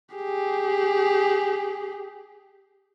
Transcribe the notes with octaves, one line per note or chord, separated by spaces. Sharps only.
G4 G#4